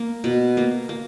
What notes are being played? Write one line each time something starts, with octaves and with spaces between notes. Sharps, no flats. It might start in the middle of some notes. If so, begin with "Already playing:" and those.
Already playing: A#3
B2
A#3
A#3